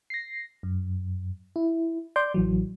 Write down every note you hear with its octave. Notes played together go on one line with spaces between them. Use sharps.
A#6 C7
F#2
E4
D5 C6 D6 G6
A1 E3 F#3